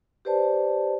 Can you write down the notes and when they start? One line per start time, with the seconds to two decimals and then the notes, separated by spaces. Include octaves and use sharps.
0.25 G4 B4 C5 D5 A5